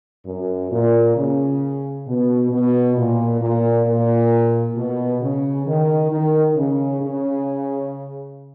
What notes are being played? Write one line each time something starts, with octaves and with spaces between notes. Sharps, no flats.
F#2
A#2
C#3
B2
B2
A#2
A#2
A#2
B2
C#3
D#3
D#3
C#3
C#3